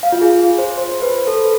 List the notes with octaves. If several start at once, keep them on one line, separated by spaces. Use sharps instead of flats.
F5
F4
G#4
C5
C5
C5
B4
A4